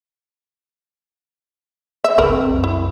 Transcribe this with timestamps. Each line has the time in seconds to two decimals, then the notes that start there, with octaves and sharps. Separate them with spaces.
2.04 E5
2.18 G1 C#2 A#4 B4
2.32 C4
2.50 C2 F#2
2.64 E4